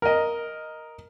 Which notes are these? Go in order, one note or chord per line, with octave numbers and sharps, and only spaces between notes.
A#4 D#5